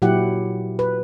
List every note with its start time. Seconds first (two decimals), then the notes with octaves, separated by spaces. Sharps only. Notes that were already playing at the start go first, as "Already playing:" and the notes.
0.02 A#2 F#3 E4 G4 F#5
0.79 B4